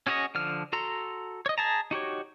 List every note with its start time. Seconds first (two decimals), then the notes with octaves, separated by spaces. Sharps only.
0.07 C#4 F#4 G#4 C#5 D#5
0.35 D3 F3 F6
0.73 F#4 A4 A#5 C6
1.46 C#5 D#5
1.58 G#4 A5 A#5
1.91 D#4 F#4 G4 C#5